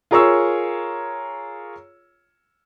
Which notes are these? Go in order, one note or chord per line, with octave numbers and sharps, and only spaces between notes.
F4 G#4 A#4 C#5 C#6 E6